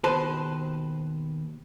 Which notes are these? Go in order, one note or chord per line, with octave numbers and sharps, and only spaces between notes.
D#2 B2 B4 C5 A5